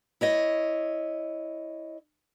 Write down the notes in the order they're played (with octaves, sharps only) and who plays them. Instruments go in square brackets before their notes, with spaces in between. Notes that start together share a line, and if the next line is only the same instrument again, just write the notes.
[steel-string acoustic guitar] E4 C#5 D#5